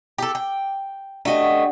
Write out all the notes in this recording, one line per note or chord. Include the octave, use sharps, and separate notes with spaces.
G4 A4
G5
A3 D4 F#4 G4 D#5